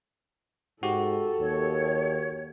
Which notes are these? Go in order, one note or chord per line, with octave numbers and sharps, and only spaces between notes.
G#2 F#4 G4 A4
D#2 C#5